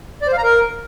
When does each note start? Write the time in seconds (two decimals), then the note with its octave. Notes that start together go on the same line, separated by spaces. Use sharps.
0.22 D5
0.27 C5
0.33 F5
0.38 A#5
0.43 A#4